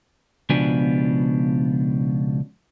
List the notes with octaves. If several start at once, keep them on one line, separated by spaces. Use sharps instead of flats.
C#2 B2 F3 B3 D4 G#5